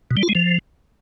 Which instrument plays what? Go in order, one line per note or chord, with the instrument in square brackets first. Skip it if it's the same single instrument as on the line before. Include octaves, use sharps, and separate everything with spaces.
[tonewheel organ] B2
G3
F4
G#3
F3